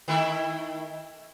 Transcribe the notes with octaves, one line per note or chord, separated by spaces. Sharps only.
D#3 A3 E4